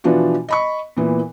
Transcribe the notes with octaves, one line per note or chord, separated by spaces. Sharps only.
B2 E3 F3 D4 F4 F#4
D#5 B5 C#6
A#2 E3 B3